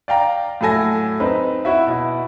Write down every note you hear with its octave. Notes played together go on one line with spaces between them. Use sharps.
D5 F5 G5 A#5
A2 F#3 A4 G#5 A#6
C4 D#4 B4
E4 F#4 E5
B2 E4